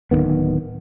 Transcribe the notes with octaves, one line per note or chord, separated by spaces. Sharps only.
D1 F#2 D#3 B3